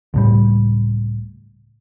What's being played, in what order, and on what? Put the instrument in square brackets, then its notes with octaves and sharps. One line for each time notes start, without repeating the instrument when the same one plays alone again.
[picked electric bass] C#2 A2 G3